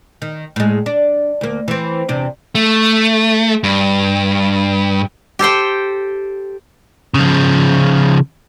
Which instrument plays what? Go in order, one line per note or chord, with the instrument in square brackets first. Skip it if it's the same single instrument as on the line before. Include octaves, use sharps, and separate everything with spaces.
[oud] D#3
A2 G#3
D4
D2 A#3
E3 C4
E2 C3 D4
[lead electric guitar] A3
G2
[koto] G4 A4 C5 G5
[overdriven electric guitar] C#3 F3